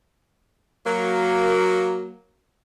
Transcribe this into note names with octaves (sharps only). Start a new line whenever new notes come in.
F#3 A#3